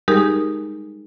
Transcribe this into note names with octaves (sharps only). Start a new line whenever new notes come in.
G3 G#3 D#4 G4 G#4 A#4